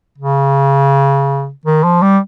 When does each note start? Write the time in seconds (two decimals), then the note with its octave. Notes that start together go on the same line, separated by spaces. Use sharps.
0.18 C#3
1.66 D#3
1.84 F3
2.02 G3